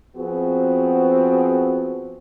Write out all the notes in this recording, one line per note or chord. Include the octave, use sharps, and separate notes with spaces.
F3 B3 C4 F#4 G#4